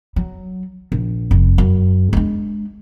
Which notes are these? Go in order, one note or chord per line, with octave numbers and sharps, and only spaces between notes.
F#3
A#1
F1
F#2
G#3 D4